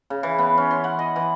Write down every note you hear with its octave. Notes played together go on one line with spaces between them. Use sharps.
C#3
E3
B3
C#4
C6
F#5
D#5
E3